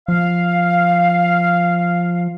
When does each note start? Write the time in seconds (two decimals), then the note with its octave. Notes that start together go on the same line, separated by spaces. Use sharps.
0.08 F3 F5